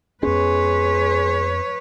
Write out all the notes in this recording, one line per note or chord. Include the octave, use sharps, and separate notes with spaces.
F2 G#3 B3 C#4 B4 C#5